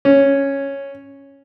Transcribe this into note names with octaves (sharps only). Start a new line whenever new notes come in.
C#4